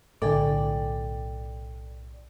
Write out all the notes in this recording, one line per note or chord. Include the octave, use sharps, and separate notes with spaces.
B1 A2 D3 A4 D5 G5 G#5 D6